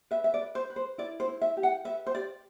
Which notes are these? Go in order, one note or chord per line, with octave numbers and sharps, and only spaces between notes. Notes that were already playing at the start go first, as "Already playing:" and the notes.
B4 E5
E5
D5
B4
C5
B4
C5
E4 D5
C5
E4
E5
G4
F#5
B4 E5
C5
G4 D5